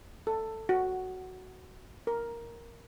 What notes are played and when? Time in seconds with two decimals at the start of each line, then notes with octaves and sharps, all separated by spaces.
0.27 A4
0.69 F#4
2.07 A#4